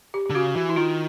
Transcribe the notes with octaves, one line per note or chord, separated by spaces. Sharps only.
G4
G4
D3
C#3 F#4
E3 F#4
E4
D#3 F4